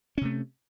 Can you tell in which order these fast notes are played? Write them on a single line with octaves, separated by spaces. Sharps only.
C#4 C3 A3